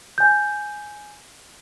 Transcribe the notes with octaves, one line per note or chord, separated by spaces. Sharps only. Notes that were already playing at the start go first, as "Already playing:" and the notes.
G#5 G6